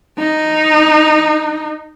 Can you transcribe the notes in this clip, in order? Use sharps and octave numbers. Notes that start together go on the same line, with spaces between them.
D#4